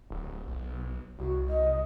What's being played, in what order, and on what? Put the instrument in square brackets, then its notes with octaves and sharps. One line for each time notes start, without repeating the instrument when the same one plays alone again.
[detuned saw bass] D1
B1
[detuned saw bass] C2 [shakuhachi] F#4
[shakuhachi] D#5